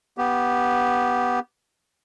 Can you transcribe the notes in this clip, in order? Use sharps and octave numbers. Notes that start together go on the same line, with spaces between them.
B3 G4